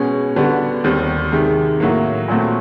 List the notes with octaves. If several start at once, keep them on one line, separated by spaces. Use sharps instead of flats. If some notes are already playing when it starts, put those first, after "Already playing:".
Already playing: B2 G#3 C#4
D3 G3 B3 D4 F#4
D#2 D#3 G3 C4
C3 D#3 G#3
A2 F#3 A#3
A#2 F#3 A3 C4